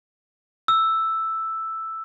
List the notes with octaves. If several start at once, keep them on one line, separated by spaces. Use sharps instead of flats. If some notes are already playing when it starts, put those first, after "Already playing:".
E6